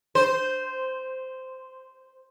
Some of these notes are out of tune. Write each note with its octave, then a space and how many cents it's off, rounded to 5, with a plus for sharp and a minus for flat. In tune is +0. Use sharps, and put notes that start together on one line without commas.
C5 -10